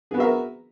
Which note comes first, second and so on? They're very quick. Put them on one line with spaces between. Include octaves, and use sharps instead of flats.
G#4 B3 F#4 E5 A#4